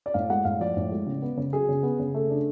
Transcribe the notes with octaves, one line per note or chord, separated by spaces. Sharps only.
D5
A2 F5
G#3 F#5
A2 F5
F3 D5
A2
G#3
C#3
B3
C#3
F#3 G#4
C#3
B3
C#3
A3
D4